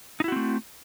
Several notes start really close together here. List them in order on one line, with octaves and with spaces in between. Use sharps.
D#4 E4 F#4 C4 A3